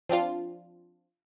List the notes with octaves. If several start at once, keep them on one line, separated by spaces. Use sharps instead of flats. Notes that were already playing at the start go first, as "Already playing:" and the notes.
F3 C4 D4 F4